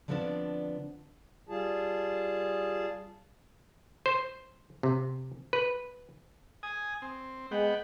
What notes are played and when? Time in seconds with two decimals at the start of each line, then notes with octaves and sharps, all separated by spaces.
0.08 D3 F3 G3 B3 C4 D4
1.49 G3 F4 G#4 A5
4.06 C5
4.83 C3
5.53 B4
6.63 G#5 D#6
7.02 C4
7.52 G#3 B3 F#5 G5